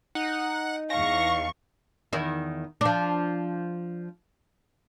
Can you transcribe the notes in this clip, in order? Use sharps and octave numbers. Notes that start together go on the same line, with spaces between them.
D#4 F#5
E2 F5 C#6 A#6
E2 D#3 E4
F3 D4